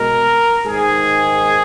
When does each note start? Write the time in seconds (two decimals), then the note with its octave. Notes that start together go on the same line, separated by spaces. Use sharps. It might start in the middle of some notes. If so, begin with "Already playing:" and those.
Already playing: B2 G#3 A#4
0.66 G#2 D#3 G#3 G#4